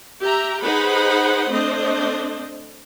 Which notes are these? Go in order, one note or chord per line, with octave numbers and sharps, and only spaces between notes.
G4 E5 A#5
D#4 G#4 B4 C5 F#5 B5
A3 C4 D4 C5 D#5